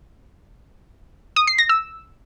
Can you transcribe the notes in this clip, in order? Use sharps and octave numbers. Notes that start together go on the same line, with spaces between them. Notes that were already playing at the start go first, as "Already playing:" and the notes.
D#6
C7
A#6
E6